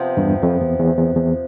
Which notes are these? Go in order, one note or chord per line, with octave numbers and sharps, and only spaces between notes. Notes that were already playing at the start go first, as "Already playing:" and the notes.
Already playing: C3 F3 B3
E2 G2
F2
E2
E2
E2
E2